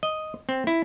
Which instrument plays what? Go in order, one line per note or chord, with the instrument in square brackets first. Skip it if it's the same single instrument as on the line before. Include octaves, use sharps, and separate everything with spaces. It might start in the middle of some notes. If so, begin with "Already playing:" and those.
[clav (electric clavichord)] D#5
C4
E4